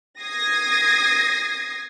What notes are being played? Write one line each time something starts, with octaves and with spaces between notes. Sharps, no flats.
D#6 G#6 A#6 C7